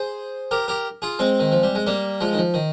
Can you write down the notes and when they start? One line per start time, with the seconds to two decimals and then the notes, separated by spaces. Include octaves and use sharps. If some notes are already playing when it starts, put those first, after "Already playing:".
Already playing: G#4 C5
0.51 G4 A#4
0.68 G4 A#4
1.02 F4 G#4
1.19 G#3 C4
1.40 D#3
1.52 F3
1.63 G3
1.75 G#3
1.87 G3 A#3
2.21 F3 G#3
2.33 D#3
2.38 F3
2.54 D#3